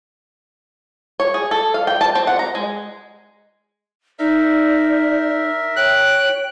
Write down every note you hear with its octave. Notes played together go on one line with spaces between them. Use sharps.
C#5
G#4
A4
F5
G5
A5
C4
F#5
A#5
G#3
D#4 A#4 D5 E5
C#5 G5 F#6